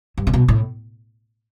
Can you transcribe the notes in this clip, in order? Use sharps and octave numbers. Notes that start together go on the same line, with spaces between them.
G2
C3
B2
A2